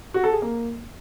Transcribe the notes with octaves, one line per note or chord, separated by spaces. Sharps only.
F#4
A4
G#4
A#3